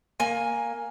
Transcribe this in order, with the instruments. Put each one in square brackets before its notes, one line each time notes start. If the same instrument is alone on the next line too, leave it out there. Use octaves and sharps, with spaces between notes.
[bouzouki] A#3 G#5